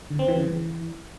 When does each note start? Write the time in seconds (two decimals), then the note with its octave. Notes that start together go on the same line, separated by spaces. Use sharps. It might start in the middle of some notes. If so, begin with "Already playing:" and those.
0.10 D3
0.19 C4
0.28 E3
0.37 C#3
0.46 E3